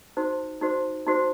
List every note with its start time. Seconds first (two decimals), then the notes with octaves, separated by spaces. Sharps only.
0.17 D#4 F#4 C5
0.61 D#4 F#4 C5
1.07 D#4 F#4 C5